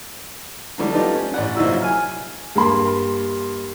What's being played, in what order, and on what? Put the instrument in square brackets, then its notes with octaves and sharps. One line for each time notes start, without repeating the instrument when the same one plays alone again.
[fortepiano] D3 E3 F#3 G3 A3 D4
A3 B3 D4 D#4 F4 G4
C#4
A1 D5 F#5
C2 A#2 F#3 D#4 E4 E6
G#5 F6
[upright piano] G2 A#3 B5 C6